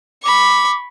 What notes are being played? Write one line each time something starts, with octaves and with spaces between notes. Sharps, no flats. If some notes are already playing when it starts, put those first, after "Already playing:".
B5 C#6 D6